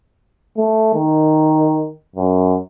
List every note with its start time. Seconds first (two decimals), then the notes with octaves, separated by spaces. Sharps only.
0.57 A3
0.94 D#3
2.16 F#2